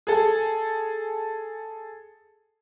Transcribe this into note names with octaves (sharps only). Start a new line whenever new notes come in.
G#4 A4